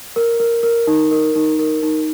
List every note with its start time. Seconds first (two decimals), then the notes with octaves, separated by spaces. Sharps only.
0.16 A#4
0.40 A#4
0.63 A#4
0.87 D#4
1.11 A#4
1.35 D#4
1.59 A#4
1.83 D#4